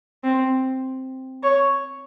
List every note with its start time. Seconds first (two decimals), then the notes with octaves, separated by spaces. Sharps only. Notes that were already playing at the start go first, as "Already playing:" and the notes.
0.24 C4
1.43 C#5